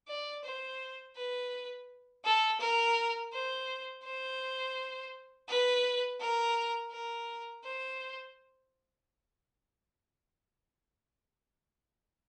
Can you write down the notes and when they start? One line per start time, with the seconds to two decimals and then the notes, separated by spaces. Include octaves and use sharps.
0.08 D5
0.44 C5
1.16 B4
2.25 A4
2.60 A#4
3.33 C5
4.04 C5
5.49 B4
6.21 A#4
6.91 A#4
7.64 C5